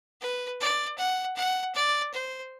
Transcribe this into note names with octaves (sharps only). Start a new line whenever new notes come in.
B4
D5
F#5
F#5
D5
C5